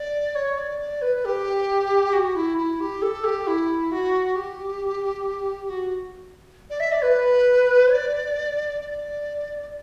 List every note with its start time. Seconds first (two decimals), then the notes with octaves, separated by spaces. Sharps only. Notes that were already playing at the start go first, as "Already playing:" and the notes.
Already playing: D5
0.35 C#5
0.58 D5
0.80 D5
1.02 B4
1.25 G4
2.13 F#4
2.36 E4
2.58 E4
2.80 G4
3.02 A4
3.24 G4
3.47 E4
3.92 F#4
4.35 G4
5.70 F#4
6.70 D5
6.80 E5
6.92 D5
7.03 B4
7.92 D5
8.81 D5